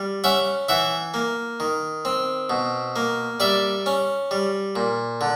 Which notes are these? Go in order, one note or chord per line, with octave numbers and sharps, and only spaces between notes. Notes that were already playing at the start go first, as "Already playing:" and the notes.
Already playing: G3
C#4 E5 F#5
E3 E5 F#5
A#3
D#3
C4
B2
A#3
G3 D5 E5
C#4
G3
A#2
D3